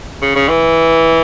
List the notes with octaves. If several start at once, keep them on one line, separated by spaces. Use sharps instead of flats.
C#3
C#3
E3